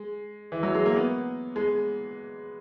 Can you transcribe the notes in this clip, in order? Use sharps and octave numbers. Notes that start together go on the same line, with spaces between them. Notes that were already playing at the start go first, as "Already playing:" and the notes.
Already playing: G#3
E3
F#3
G#3
A#3
B3
G#3